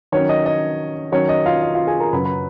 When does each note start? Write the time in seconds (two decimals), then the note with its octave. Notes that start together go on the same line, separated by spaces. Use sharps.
0.12 D#3 F#3 C#4 C#5
0.29 D#5
0.46 D#5
1.12 D#3 F#3 C#4 C#5
1.29 D#5
1.46 F4 F5
1.62 D#5
1.75 F4 F5
1.87 G#4 G#5
2.00 A#4 A#5
2.13 F#2 C#3 F#3 B4 B5
2.25 B4 B5